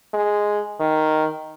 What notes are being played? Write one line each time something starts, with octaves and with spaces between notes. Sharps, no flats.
G#3
D#3